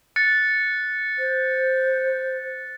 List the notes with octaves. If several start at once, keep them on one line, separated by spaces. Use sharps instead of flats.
F#6 A6 C#7
C5